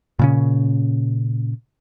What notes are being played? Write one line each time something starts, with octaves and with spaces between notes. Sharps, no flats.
A#2 C#3 C#4